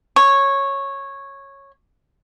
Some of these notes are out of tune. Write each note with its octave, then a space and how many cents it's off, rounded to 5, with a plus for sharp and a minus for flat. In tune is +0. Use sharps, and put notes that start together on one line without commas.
C#5 -10